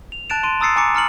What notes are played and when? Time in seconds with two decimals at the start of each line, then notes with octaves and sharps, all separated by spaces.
0.12 F7
0.30 A5 F#6 A6 D7 E7
0.43 C6 D7 D#7
0.60 A#5 D#6 E6 A6 C7 C#7
0.76 G#5 A#5 D6 C#7
0.95 A#5 F6 C#7 F#7